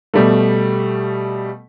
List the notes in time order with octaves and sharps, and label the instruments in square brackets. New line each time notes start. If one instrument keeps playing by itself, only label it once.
[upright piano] B2 G3 A3